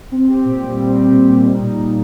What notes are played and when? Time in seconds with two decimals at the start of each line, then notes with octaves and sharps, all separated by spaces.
0.12 C4
0.29 G4
0.45 A#2
0.61 G3
0.79 C4
0.95 G4
1.12 A#2
1.29 G3
1.45 D#4
1.62 A#2
1.78 A#2